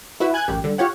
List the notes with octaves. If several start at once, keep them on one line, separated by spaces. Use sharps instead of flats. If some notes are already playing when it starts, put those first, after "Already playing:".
E4 F#4 B4 E5
G#5 F#6 G#6
A1 F#2 G4
D3 G3
F4 G4 C#5 F#5